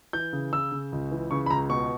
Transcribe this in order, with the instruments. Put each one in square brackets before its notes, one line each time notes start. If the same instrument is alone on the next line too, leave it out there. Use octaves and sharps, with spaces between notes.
[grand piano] E3 G6
C#3
C#3 E6
C#3
C#2
E3
C#3 C#6
B5
C#2 A#5
B2 C#6